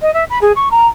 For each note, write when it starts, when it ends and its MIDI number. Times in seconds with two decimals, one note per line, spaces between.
0.01 0.12 75
0.13 0.24 76
0.30 0.38 83
0.41 0.52 68
0.55 0.68 85
0.71 0.86 82